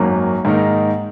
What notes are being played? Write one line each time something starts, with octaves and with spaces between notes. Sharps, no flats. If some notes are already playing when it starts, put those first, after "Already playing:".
Already playing: G#1 F#2 F#3 A#3
G#2 D#3 A#3 D#4 A#4